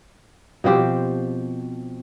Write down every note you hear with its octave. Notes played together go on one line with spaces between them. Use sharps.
B2 F3 C4 G4